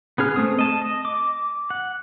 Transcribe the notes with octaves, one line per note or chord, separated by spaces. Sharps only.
B3 C#4 G#4 F6
A3 C4 D#6
D#5 A5
D#5
D6
F#5